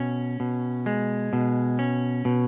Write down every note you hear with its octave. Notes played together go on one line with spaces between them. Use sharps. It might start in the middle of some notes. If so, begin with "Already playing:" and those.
Already playing: B2 C#4
B2
G#3
B2
C#4
B2